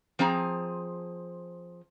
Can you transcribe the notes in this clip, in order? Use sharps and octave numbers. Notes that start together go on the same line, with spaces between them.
F3 C4 G#4 A#5